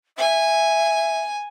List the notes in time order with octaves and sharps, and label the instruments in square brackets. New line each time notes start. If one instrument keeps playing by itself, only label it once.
[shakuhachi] E5 [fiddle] G#5